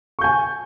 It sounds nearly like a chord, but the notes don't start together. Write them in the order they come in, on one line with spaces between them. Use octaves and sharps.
C#6 G6 G#5